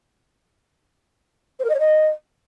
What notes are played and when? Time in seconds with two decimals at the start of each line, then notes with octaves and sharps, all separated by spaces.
1.59 C5
1.64 A#4
1.69 D#5
1.74 C#5
1.79 D#5